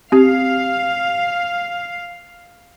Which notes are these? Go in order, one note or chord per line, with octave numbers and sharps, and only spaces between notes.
C4 G4 F5